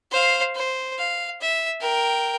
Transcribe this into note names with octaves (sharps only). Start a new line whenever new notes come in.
C5 F5
C5
F5
E5
A#4 G5